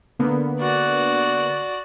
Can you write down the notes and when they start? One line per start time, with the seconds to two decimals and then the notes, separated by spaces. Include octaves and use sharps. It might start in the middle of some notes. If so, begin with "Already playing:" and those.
0.19 D3 A#3 B3
0.61 F#4 D5